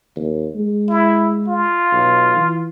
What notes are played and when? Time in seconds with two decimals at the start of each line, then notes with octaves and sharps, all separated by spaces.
0.16 D#2
0.55 G#3
0.90 E4
1.48 F4
1.93 B1
2.36 E3